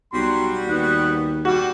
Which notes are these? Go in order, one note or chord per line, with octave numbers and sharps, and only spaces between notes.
B1 F#3 G3 F#4 C6
D#2 B3 F#5
G3 F#4